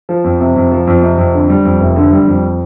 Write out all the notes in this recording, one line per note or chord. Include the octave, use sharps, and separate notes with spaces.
F3
F2
C3
F2
F3
F2
C3
F2
D3
G3
F2
F1
D3
G3
F2